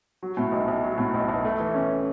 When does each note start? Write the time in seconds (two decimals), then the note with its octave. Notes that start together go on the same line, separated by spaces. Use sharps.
0.22 F#3
0.37 A2
0.52 B1
0.68 B1
0.84 F#3
0.98 A2
1.14 B1
1.29 B1
1.45 A3
1.60 E3
1.74 C#4